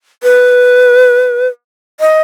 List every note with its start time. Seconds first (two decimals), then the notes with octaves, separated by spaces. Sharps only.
0.23 B4
2.00 D#5